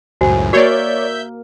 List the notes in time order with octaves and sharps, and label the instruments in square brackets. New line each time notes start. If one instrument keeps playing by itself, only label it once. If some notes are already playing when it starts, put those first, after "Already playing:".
[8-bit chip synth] C#2 F#2 A2 [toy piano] F#4 C5 G#5
[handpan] A#3 A#4 [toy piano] F#4 [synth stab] C#5 D5 [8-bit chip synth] E5 G6